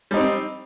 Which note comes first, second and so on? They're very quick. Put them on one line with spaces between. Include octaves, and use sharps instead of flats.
G3 D#4 C4